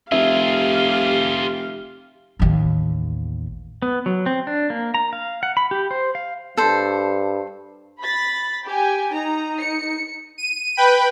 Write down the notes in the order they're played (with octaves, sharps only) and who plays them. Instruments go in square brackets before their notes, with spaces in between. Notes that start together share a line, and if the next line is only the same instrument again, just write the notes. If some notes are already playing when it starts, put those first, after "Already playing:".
[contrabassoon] F1 [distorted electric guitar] F4 G#4 [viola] G4 F5 [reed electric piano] E5
[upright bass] A1 D#2
[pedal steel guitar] B3
F#3
C4
D4
A#3
A#5
F5
F#5
B5
G4
C5
F5
[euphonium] G2 [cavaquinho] A4 C5
[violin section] B5 A6 B6
G4 G#5
[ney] D#4 [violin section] A#5
[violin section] C#7
[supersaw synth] D#7
B4 G5 B5